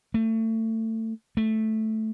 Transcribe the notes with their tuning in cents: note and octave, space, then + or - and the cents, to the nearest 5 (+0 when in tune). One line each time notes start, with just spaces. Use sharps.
A3 +25
A3 -5